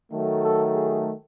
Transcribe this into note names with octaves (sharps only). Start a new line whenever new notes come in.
D#3 F#3 A3
A4
G#4